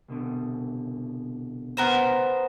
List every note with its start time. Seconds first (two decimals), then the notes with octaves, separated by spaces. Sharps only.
0.08 C2 B2 D3
1.77 B3 A#4 C5